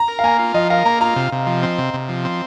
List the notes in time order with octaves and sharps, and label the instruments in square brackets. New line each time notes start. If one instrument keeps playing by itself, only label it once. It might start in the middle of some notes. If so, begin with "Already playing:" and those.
Already playing: [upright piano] A#5
[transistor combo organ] A#4
[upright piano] F5
[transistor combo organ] A#3 [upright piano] G#5
[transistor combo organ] F4
[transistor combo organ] F3 [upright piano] D#5
[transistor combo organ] A#4 [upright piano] F5
[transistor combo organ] A#3 [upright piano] A#5
[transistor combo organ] F4 [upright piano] A#5
[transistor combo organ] C3
C3
F3
C4
C3
C3
F3
C4